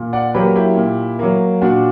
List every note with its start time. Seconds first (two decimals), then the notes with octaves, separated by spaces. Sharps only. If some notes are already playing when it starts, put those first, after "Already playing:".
Already playing: A#2
0.13 D5 F#5
0.34 F#3 A#3 G4 B4
0.56 E4 G4
0.77 A#2
1.19 F#3 A#3
1.62 A#2 D4 F#4